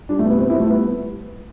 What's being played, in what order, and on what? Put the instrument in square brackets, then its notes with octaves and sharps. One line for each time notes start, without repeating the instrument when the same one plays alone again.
[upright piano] G3 D4
A3
B2
B3
B2 C4
E4
G3
A3
G3 B3